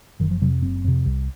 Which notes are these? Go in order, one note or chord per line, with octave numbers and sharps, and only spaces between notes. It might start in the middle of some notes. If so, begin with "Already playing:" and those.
F#1 D#3
F3
F2 C3 F#3
F#1 C4
F2 C3
C2